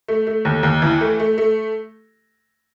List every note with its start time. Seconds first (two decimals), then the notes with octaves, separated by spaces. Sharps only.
0.08 A3
0.27 A3
0.45 D#2
0.63 D#2
0.82 E3
1.01 A3
1.20 A3
1.38 A3